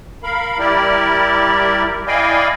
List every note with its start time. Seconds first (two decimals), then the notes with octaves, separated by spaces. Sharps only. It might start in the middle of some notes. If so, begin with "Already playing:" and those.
0.23 A#4 F5 B5
0.59 G3 E4 G4 A#4 D5
2.07 E4 D5 D#5 F5 G5 G#5